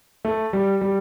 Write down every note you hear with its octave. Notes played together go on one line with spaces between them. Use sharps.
A3
G3
G3